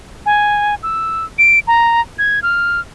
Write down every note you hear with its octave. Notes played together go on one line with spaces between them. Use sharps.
G#5
E6
D7
A#5
G#6
F6